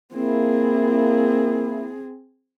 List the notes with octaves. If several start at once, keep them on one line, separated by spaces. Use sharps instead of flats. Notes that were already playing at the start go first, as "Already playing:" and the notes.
A#3 C4 E4 G#4